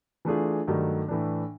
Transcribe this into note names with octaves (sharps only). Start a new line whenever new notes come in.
E3 A3 D4 F4 G#4
G2 D#3 F#3 A3
A2 E3 A3 D4